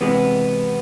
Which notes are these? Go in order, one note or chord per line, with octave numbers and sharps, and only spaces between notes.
C3 E3 G#3 B3